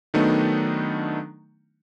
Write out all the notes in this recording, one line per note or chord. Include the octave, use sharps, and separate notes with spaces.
D#3 F#3 A3 B3 D4 D#4